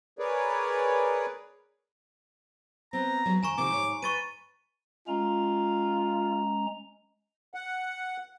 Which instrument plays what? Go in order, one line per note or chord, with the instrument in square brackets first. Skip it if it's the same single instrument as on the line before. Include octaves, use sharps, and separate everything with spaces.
[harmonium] G#4 A#4 B4 C#5 D5
[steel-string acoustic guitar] B3 C4 [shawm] A#5
[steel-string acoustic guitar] F#3 G#3 B3
[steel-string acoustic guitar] F2 D#3 [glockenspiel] G#5 A#5 C#6
[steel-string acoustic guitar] C3 D#3 F3 [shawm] D6
[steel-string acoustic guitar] G#2 B4 C#5
[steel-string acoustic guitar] B4 [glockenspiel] C#6 A6 D#7
[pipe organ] G#3 C#4 A#5 [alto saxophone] F4
[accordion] F#5